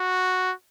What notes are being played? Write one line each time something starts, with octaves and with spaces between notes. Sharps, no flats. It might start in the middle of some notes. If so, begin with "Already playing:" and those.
Already playing: F#4